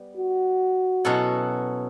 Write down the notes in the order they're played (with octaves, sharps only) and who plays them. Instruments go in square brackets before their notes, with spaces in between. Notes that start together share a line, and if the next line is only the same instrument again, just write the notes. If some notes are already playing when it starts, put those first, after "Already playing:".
Already playing: [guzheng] G3 B3
[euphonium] F#4
[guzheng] B2 F#3 C#4 E4 A4